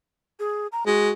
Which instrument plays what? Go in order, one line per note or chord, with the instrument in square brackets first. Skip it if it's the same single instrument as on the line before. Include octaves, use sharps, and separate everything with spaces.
[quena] G#4
A#5
[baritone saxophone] G#3 [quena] F#4